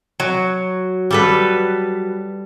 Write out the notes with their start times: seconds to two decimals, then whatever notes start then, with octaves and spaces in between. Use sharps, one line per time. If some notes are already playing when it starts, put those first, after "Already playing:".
0.20 F#3
1.11 G3 A4 B4